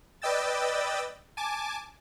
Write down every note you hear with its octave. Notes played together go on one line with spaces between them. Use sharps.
B4 D5 D#5 G5 E6 A6
G#5 A5 D6